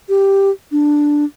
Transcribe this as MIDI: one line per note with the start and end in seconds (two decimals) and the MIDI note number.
0.09 0.51 67
0.72 1.24 62